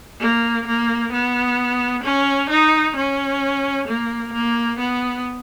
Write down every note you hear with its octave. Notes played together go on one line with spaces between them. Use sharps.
A#3
A#3
B3
C#4
D#4
C#4
A#3
A#3
B3